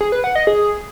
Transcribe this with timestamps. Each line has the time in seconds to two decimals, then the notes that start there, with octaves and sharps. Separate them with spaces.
0.01 G#4
0.12 B4
0.24 F#5
0.35 D#5
0.47 G#4